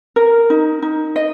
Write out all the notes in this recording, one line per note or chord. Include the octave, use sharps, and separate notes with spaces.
A#4
D#4
D#4
D#5